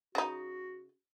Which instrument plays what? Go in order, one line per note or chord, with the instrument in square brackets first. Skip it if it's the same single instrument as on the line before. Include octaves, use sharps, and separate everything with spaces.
[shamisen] C#3 D#4 [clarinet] F#4